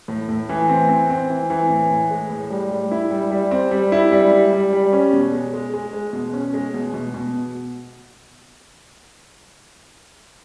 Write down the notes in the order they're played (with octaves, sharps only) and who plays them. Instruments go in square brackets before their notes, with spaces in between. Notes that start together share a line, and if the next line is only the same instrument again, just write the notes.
[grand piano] A2
A2
E3
C4
C4
C4
E3
E3
A2
A2
G#3
A2
G3
G3
E4
G3
G3
C4
G3
E4
G3
G3
G3
G3
C#4
B2
G#3
G#3
G#3
G#3
B2
C#4
G#3
B2
B2
B2